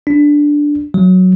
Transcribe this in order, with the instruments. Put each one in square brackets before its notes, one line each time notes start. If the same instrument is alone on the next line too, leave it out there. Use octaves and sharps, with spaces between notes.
[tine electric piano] D4
F#3